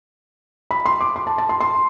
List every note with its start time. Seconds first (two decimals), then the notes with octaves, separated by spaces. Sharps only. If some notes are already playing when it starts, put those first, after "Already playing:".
0.71 B5
0.86 C6
1.01 D6
1.16 C6
1.27 A5
1.38 A5
1.49 C6
1.61 C6